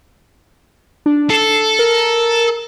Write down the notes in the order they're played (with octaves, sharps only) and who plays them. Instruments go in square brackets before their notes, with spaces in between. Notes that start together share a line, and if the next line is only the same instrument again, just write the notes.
[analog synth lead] D4
[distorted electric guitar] A4 [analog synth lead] C7
[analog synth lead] A#4